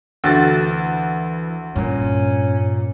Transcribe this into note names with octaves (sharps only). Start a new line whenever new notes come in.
D2 E3 F#4 A6
G2 A#2 C#4